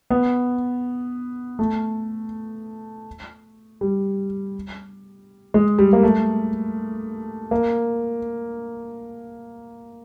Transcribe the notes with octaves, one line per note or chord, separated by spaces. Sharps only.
B3
A3
G3
G#3
G3
A#3
A3
A#3